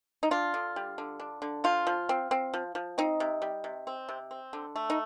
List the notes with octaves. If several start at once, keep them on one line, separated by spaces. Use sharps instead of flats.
D#4
D4 F4
D3
G3
D3
D4
D3
F3 F4
F3
C4
C4
F3
F3
C4 D#4
C3
G3
C3
C4
C3
C4
D3
A3
D#4